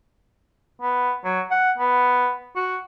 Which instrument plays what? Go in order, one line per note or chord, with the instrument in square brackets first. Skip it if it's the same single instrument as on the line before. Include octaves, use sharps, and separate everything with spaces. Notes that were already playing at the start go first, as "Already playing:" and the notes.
[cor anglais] B3
F#3
F#5
B3
F#4